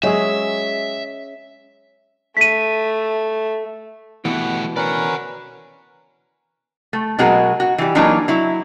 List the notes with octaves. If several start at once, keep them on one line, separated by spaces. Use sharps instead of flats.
F#3 G#3 C#4 G#4 D#5 E5
A3 B6 D#7
B2 E3 A3 G4 F#5
C#4 A#4 B4 D5 F#5
A3
B2 F#3 G#3 F#4 A#4
F#4
E3 G3
E3 F#3 A#3 D4 D#4
F#3 E4